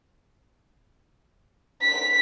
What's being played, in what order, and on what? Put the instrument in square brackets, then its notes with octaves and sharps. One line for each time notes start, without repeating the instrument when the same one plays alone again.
[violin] B6